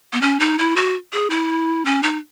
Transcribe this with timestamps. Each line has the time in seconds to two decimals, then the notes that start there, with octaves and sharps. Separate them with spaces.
0.13 B3
0.21 C#4
0.40 D#4
0.58 E4
0.76 F#4
1.13 G#4
1.30 E4
1.85 C#4
2.03 D#4